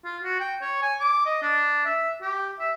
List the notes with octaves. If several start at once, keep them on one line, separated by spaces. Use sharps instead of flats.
F4
F#4
G5
C#5
G#5
D6
D#5
D4
E5
G4
E5